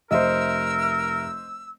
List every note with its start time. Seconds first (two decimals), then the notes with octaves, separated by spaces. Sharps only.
0.11 F1 A#4 C5 D#5 E5 E6